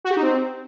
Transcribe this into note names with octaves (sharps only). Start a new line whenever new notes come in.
F#4
G4
D#4
C4